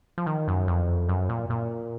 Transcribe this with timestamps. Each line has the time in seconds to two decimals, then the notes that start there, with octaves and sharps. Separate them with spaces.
0.18 F3
0.27 D#3
0.48 F#2
0.68 F2
1.09 F#2
1.29 A#2
1.50 A#2